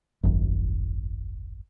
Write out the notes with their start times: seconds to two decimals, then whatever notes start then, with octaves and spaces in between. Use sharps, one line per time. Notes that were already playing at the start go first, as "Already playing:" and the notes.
0.23 D#1 G#1 F#2